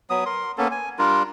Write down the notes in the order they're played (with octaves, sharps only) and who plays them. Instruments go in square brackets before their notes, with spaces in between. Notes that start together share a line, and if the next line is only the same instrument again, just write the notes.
[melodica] F#3 B3 D#6
A#4 C6
A#3 B3 C#4 A4
G#5
G3 D4 F4 A#4